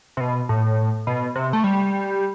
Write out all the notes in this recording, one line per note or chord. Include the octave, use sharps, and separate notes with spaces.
C3
B2
A2
B2
C3
A3
G3